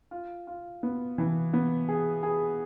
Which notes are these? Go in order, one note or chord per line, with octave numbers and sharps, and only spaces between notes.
F4
F4
B3
E3
B3
G#4
G#4